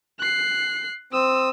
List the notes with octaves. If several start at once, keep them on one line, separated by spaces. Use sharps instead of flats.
F#6 C7
C4 D#6 E6